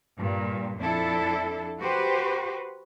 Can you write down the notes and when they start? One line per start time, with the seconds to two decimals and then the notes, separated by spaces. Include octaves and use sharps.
0.17 G2 A#2
0.78 F2 D4 E4 A4
1.80 F#4 G4 B4 C5